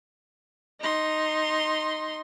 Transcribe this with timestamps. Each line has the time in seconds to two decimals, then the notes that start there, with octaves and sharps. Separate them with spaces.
0.81 D#4 C6